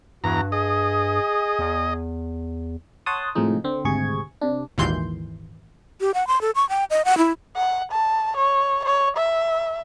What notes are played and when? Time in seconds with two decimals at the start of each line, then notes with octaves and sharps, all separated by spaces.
0.24 E2 G2 F#4 A#5
0.52 G#4 D#5
1.59 E2
3.06 C#5 F#5 A5 C6 D#6
3.35 A2 C3 F3 G#3 D#4
3.64 D3 C4
3.84 G#1 D2 C3 G#4 C#6 G#6
4.41 C3 D4
4.78 G#1 D#2 A#2 E3 C6 G6
6.01 G4
6.14 F#5
6.27 C6
6.41 A4
6.55 C#6
6.69 G5
6.90 D#5
7.05 F#5
7.18 E4
7.56 F#5
7.92 A5
8.37 C#5
8.85 C#5
9.17 E5